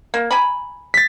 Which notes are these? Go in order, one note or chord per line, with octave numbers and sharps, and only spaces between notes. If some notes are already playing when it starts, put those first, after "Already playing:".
A#3
G#5 A#5 B5
A6 B6